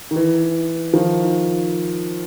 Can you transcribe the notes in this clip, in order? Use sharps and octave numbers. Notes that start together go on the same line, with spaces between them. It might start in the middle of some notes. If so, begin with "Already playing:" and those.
D#3
E3
D#3 F3